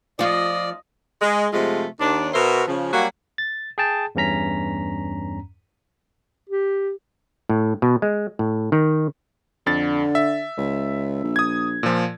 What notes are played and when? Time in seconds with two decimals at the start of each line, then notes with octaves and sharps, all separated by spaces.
0.19 F3 F4 D5 D#5
1.21 G#3
1.53 C3 F3 G#3 A3 F4
2.00 D#2 D4
2.33 B2 F#4 A#4 C5 E5
2.68 C#3 F3
2.93 F#3 G3 A#3 F#4
3.38 A6
3.78 G#4 G5 A5
4.15 E2 G2 C#4 A#5 B6
6.49 G4
7.49 A2
7.82 B2
8.02 G#3
8.39 A2
8.72 D#3
9.66 F2 D3 A6
10.15 E5
10.58 C#2
11.23 A#1
11.36 D#6 G#6
11.83 A#2 F3